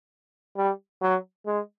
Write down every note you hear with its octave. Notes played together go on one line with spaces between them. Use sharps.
G3
F#3
G#3